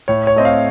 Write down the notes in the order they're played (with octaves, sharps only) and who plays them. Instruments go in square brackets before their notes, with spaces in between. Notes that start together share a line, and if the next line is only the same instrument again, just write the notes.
[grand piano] A2 C#5
C#5
A3 C4 D#5
F5